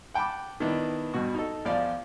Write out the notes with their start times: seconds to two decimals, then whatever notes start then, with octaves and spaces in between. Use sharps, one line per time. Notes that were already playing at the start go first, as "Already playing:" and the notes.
0.14 F#5 G5 A5 B5 D6
0.60 D#3 B3 D4 E4
1.14 G2 B2 F#4
1.35 D#4 A4
1.65 E2 F3 F4 D5